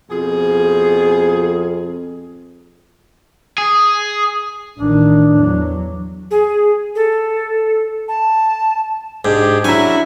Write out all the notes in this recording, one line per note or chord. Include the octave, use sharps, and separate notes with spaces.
F2 B2 F3 G#4
G#4
A1 D#3 D4
E2 F#3
G#4
A4
A5
G#2 D4 G4 G#4
F#3 C#4 D4 E4 E5 G#5 A#5